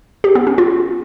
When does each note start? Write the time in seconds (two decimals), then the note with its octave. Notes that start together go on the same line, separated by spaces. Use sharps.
0.24 G4
0.35 B3
0.47 C#4
0.58 F4